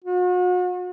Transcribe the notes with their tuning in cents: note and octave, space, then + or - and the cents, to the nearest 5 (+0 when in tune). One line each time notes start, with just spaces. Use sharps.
F#4 -40